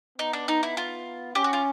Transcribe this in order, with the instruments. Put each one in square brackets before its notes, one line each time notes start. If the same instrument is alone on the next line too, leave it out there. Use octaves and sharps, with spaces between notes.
[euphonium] B3 [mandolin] D#4
[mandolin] D4
D#4
E4
F4
[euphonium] C#4 [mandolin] G4
[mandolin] F#4
F4